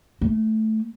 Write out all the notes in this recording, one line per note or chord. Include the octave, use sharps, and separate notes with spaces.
A3